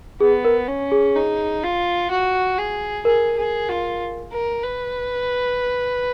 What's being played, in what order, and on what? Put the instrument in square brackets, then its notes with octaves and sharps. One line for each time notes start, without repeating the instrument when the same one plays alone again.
[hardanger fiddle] B3 [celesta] G#4
[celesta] A#4
[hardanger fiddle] C#4
[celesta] G#4
[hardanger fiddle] D#4
F4
F#4
G#4
[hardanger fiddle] G#4 [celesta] A#4
[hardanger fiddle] G#4
F4
A#4
B4